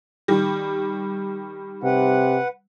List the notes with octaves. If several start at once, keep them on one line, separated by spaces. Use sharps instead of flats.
D#3 G3
C3 B4 F#5